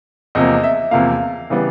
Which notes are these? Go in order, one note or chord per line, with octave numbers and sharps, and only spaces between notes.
E2 C3 F3 A#3 D#5
E5
E2 C3 F3 A#3 F5
C#3 E3 G3 B3